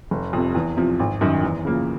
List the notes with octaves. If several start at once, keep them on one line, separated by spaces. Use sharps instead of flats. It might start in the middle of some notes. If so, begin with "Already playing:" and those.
F1
F2 C3
E2
C3 F3
G#1
F#2 D#3
E2
C#3 F3 A#3